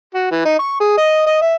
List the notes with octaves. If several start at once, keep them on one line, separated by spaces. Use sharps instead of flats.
F#4
E3
D#4
C#6
G#4
D#5
D#5
E5